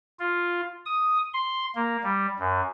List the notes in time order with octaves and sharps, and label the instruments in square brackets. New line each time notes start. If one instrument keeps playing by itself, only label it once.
[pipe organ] F4
D#6
C6
A#3
G3
F#2